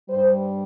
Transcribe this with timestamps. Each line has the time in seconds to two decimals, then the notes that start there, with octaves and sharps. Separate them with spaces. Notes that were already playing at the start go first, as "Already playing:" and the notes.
0.10 G2 G3 C5